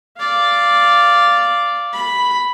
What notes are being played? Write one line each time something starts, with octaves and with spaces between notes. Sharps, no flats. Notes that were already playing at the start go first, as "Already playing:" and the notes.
D5 F5
B5